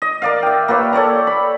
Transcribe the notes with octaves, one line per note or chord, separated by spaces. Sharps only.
D#5
A#4 D5 F5
E5 G5
A#3 G4 B4 C#5
A4 C#5 D5 A#5
B5